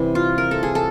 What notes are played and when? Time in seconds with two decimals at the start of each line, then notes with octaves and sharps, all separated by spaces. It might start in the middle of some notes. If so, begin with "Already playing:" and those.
Already playing: C3 E3 G3
0.15 F4
0.38 A#4
0.51 A4
0.63 G#4
0.75 A4